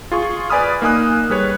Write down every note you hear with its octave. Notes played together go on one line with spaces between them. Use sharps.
F4 G#4 C#6
B4 D5 G#5 B5 D#6 F6
A#3 D#4 G#5 D#6 F#6
G3 G#4 B4 C#5